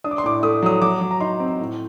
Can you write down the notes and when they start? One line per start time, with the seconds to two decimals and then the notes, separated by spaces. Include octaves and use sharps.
0.04 D4 D#6
0.11 D6
0.18 C6
0.24 A2 D6
0.43 A3 D#6
0.62 F#3 D#6
0.82 F#3 D6
1.01 F#3
1.11 A#5
1.20 D#4 C6
1.40 C4
1.59 A2